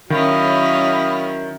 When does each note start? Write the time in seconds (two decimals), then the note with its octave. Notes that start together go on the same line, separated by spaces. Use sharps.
0.10 D#3 F#3 C#4 E4 D#5 F5 B5